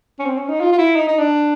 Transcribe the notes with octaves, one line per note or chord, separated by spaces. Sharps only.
C#4
C4
C#4
D#4
F4
F4
E4
D#4
D#4
D4